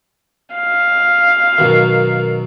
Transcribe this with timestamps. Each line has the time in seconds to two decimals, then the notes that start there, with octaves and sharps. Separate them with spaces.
0.55 F5
1.58 F#2 B2 D#3